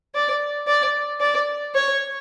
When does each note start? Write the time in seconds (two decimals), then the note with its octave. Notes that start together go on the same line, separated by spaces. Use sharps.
0.14 D5
0.67 D5
1.20 D5
1.75 C#5